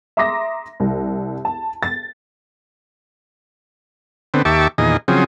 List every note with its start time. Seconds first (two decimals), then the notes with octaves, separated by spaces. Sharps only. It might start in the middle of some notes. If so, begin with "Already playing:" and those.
0.17 E5 A#5 C6 D6 D#6 A#6
0.80 C2
1.45 A5
1.83 A6
4.34 D3 B3 C4
4.45 D#2 G4 E5 A5 C#6 D6
4.78 E2 A#2 D#3 G#4 D#5
5.08 C#3 F3 F#3 C4 G#4